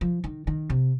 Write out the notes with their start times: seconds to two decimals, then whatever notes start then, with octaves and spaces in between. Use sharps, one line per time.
0.01 F3
0.24 D#3
0.47 D#3
0.70 C3